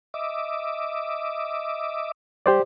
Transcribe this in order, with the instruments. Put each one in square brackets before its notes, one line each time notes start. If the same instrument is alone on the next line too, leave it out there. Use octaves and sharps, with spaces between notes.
[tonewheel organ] D#5 E5 D6
[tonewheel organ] G3 [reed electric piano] G4 C5 D5